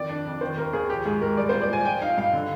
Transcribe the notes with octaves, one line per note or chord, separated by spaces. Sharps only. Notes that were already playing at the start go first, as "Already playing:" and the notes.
Already playing: F2 D#3 D5
D4
F2
D#3 C5
D#2 A#4
D#2 G#4
F3 G4
G#2 G#4
G#2 A#4
G3 D5
A#2 C5
D5
A#2 G#5
F3 G5
D#4 F5
G2 F5
D3